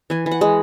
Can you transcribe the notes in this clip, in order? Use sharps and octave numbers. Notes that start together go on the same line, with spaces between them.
E3 G#5
E3
F#5
G#3